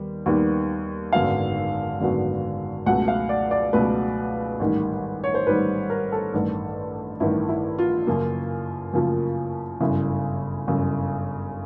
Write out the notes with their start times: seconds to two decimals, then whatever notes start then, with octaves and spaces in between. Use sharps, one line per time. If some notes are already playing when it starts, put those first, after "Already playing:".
Already playing: D#2 D#3 G3 B3
0.26 D#2 D#3 G3 B3
1.13 G#1 F#2 D3 F#3 B3 F5
2.00 G#1 F#2 D3 F#3 B3
2.86 C#2 B2 F#3 A3 F#5
3.08 F5
3.29 D5
3.51 D5
3.73 C#2 B2 F#3 A3 B4
4.60 A1 G#2 D#3 G3
5.24 C#5
5.34 C5
5.47 A1 G#2 D#3 G3 B4
5.90 A#4
6.12 A4
6.34 A1 G2 D#3
7.20 A1 G2 D#3 E4
7.49 E4
7.79 F4
8.07 F#2 C#3 F3 A#3
8.93 F#2 C#3 F3 A#3
9.80 G1 F#2 C#3 E4
10.67 G1 F#2 C#3